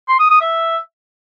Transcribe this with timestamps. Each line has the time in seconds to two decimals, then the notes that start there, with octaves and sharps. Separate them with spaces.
0.08 C6
0.19 D#6
0.30 D#6
0.41 E5